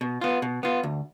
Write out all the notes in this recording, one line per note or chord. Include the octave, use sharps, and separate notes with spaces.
B2
B3 F4
B2
B3 F4
D2